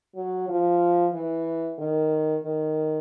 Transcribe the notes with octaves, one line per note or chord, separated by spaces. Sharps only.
F#3
F3
E3
D#3
D#3